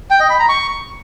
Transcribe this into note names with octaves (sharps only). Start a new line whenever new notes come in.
G5
D#5
B5
A#5
C#6